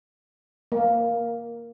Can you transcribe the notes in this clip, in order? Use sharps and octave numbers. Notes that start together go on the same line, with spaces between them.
A#3